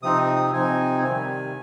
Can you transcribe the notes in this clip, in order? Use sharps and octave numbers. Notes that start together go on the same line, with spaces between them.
C3 F3 C4 D#4 D#6
D#6
C3 F3 C4 D#4 G#5
C3 D#3 G3 G#5